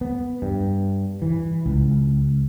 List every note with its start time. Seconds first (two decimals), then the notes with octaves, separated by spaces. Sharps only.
0.01 B3
0.42 G2
1.22 E3
1.66 C#2